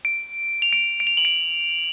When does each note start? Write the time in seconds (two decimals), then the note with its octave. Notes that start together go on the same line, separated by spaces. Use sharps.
0.05 D7
0.62 F7
0.73 D7
1.00 D7
1.07 F7
1.17 F#7
1.25 D7